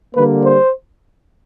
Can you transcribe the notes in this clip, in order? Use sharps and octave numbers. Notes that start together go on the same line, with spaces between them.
D3 G3 A#3 B4
C5